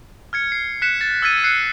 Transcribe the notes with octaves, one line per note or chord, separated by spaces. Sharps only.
F6 G#6 C#7
C7
F#6 B6 C#7 E7
A6
E6 F6 G#6 A6 B6 D#7
F#6 C7 C#7